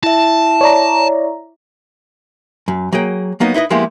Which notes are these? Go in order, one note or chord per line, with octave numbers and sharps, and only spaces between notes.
E4 E5 A5
C#5 D5 A#5
F#2
F#3 A#3 G#4 G5
F#3 A#3 B3 D#4
D#4 E4 B4 D#5
F3 G#3 A#3 B3 E4 G4